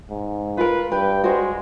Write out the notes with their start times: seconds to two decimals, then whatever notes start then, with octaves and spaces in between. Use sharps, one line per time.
0.10 G#2
0.57 F4 A#4 B4
0.92 G2 B4 G5
1.24 G#3 F#4 C5